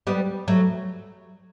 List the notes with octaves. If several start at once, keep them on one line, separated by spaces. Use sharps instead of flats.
G3 B3
F#3 A3